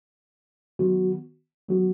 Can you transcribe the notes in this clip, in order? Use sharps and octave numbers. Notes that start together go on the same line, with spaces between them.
D#3 F#3 B3 F#4
D#3 F#3 B3 F#4